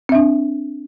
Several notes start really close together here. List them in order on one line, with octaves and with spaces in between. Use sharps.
C4 E5 D4